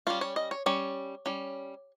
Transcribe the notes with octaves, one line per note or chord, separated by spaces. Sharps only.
G3 C#4 F4
C#5
D#5
C#5
G3 C#4 C#5
G3 C#4